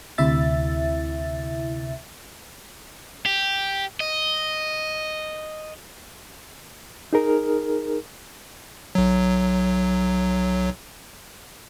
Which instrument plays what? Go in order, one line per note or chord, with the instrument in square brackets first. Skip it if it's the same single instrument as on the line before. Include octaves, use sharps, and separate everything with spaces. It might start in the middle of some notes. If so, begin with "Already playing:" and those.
[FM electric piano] D2 C3 E4 E5 A6
[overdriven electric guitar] G4
D#5
[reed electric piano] D#4 G#4 A#4
[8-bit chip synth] B1 F#3